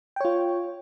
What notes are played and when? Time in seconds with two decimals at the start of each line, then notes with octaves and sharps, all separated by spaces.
0.16 G5
0.20 C#5
0.25 F4